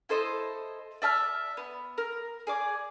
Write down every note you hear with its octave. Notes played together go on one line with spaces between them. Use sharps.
E4 A4 C5 D#5
D5 E5 A5 F6
B3
A#4
G#4 D5 D6